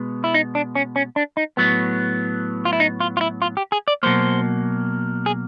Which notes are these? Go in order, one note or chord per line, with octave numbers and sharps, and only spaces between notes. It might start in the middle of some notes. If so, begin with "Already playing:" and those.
Already playing: B2 G#3 B3
E4
D#4
D4
C#4
C#4
D4
D#4
A2 F#3 B3
F4
E4
D#4
F4
F4
E4
F4
G4
G#4
D5
B2 F#3 A#3 C5
G#4